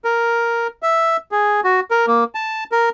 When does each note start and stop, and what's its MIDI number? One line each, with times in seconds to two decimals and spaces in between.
0.05 0.67 70
0.83 1.17 76
1.32 1.60 68
1.64 1.80 66
1.91 2.06 70
2.07 2.24 58
2.35 2.64 81
2.72 2.89 70